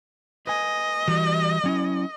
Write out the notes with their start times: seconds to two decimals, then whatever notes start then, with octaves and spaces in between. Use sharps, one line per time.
0.47 B4 D#5 G#5
1.08 E3 G3 F#4
1.64 F#3 C#4 E4